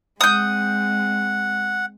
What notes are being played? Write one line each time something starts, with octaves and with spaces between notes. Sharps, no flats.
G#3 C4 F#5 D#6 G6